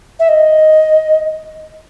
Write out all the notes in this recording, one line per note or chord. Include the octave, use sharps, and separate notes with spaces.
E5
D#5